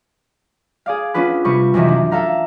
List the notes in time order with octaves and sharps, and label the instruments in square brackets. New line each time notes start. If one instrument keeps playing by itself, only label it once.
[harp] G#4 D5 F5
B3 C#4 D4 F4 B4
C3 G3 B4 C#6
F#2 C3 D#3 E3
D4
A4 E5 F5 A#5